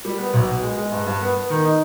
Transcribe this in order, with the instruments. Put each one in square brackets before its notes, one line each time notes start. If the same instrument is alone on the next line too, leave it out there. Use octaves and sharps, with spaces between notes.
[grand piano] G3
B3
B1
B2
G#3
G#3
G2
G2
B3
B3
D#3
D#4